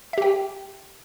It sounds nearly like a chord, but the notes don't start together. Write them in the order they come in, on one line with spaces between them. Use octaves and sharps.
E5 G4 G5